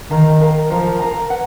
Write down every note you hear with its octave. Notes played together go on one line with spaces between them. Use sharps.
D#3 A#4 F5 A#5
A#4 F5 A#5
F3 A#4 F5 A#5
A#4 F5 A#5
B4 F#5